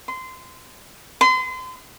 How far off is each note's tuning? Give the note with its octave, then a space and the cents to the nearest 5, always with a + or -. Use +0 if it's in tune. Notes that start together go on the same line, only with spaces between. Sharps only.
C6 -20
C6 -35